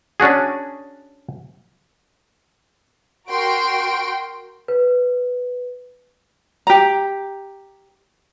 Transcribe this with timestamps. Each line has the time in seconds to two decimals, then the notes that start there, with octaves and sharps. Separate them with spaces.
0.20 C#4 D4 F#4 G#4
3.29 F#4 A#4 G5 C6 D7
4.68 B4
6.67 G4 A#5